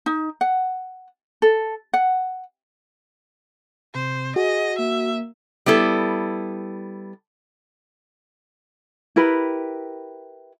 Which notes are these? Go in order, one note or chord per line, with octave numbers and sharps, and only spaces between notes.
D#4
F#5
A4
F#5
C3 C5
F#4 G#4 D#5
A#3 E5
G3 B3 E4 A4
E4 G4 A#4 B4